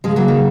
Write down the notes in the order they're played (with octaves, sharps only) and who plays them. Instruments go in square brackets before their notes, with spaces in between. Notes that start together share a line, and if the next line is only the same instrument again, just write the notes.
[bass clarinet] C#3 [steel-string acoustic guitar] F3 G#3
[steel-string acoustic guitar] F#3 A#3
D#3